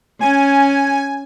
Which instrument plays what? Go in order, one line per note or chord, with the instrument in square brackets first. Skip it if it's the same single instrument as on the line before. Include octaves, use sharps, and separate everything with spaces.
[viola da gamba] C#4 [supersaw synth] G#5